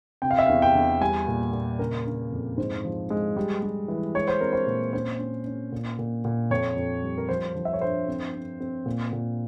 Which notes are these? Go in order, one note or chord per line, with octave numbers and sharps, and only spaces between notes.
C3 G5
F5
E5
F5
E2
G5
E2
G3 G#5
A#2
A#2
C#3 A#4
C#3
F2
G#2 C5
F3
G#3
G3
G3
E3
G#3 C#5
C5
C4 A#4
C5
A#2
C#4 C5
C#4
C#4
A#2
A#2
A#2
F2 C#5
F2
G3
A#4
F3 C5
F3
E5
C#5
G2 C5
C4
C4
C4
A#2
A#2